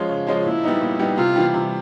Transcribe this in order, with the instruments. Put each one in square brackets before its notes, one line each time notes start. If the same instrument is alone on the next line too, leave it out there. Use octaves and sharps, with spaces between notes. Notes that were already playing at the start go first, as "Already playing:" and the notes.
Already playing: [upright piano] F3 G#3 C#4 F4
C#3
F3 G#3 C#4 F4
[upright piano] A#2 [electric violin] E4
[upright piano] G3 B3 D#4
A#2
G3 B3 D#4
[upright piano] C3 [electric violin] F4
[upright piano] E3 G3
C3